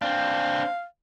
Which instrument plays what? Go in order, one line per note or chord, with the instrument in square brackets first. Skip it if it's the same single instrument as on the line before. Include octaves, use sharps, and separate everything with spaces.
[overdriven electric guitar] C4 D4 [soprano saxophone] F5